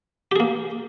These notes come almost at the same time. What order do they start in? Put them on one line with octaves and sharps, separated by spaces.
G4 G#4 A#3